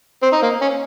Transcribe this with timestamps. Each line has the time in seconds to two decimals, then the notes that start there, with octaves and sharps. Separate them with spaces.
0.22 C4
0.33 D#4
0.43 A#3
0.61 C#4